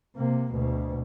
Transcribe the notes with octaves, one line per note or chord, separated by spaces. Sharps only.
C3 A#3
D2 B2